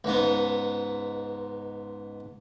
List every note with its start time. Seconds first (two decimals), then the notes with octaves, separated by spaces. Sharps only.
0.04 C#2 G#2 B3